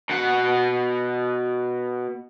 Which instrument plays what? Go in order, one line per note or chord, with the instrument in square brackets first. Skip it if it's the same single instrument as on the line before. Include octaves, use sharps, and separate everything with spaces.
[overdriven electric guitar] B2 F#5